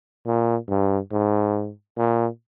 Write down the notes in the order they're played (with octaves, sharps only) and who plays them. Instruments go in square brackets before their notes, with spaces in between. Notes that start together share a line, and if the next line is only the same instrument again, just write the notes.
[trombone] A#2
G2
G#2
A#2